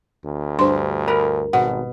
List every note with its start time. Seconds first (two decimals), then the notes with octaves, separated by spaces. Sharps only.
0.24 D2
0.59 G2 C5 C6
1.08 A#4 B5
1.53 G#1 B2 F#5